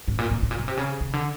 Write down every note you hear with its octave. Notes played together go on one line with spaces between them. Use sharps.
G#2
A#2
A2
A2
A#2
B2
C3
C#3
C#3
D3